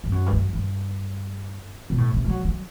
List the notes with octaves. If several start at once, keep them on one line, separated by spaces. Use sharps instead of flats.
G2
F#2
G2
F#2
G2
B2
A2
C3
G3
F#3
F#3